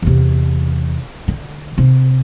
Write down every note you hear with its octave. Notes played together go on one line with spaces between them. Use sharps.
E2 C3
D3
C3